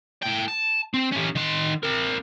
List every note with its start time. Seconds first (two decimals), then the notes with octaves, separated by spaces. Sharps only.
0.23 A2 G5
0.48 A5
0.94 C4
1.12 C#4 G4
1.35 D#3 C6
1.83 C4 A#4